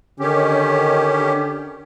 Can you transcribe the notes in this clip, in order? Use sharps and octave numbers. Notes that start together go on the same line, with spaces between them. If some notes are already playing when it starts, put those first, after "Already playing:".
D3 D#3 C#4 G4